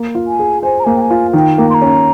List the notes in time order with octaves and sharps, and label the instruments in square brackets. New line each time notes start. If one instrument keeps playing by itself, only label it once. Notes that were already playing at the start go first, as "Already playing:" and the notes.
Already playing: [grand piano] A#3
F4
[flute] G#5
[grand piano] G#4
[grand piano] C5 [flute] G#5
[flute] A#5
[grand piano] A#3 [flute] G#5
[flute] G5
G#5
[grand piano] F4
[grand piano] D#3 [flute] G5
[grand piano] A#3
[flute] C6
A#5
[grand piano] C#4